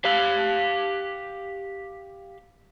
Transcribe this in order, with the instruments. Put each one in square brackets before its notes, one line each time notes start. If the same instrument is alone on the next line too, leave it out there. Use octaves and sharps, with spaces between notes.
[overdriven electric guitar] G4 F5